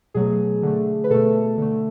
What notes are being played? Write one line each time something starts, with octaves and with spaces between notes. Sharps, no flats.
B2 F#3 A3 G#4
D3 A3
B4
B2 A3 A4
D3 A3